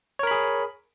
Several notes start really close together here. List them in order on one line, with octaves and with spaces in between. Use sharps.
C#5 A#4 B5 G#4